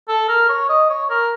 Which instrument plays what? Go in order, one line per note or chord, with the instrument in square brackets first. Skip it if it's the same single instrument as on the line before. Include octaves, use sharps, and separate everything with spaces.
[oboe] A4
A#4
C#5
D#5
C#5
A#4